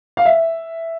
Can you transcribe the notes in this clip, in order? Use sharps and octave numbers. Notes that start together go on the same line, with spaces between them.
F5
E5